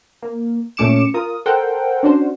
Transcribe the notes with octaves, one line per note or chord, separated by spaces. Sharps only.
A#3
A#2 A3 C#4 D6 C#7 E7
F4 A#4 D#6
A4 A#4 C5 F#5 G5
C#4 D4 F#4 C5